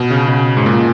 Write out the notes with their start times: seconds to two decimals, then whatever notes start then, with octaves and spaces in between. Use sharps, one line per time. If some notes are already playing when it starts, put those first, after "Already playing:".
Already playing: B2
0.10 C#3
0.28 B2
0.57 G#2
0.66 A#2